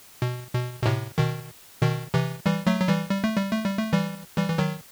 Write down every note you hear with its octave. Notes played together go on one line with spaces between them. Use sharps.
B2
B2
B2
A2 C3
B2 D#3
B2 D#3
C3 E3
E3 G3
F#3 A3
F#3
E3 G3
G3
A3
G3
A3
G3
A3
E3 G3
E3 G3
E3
D#3 F#3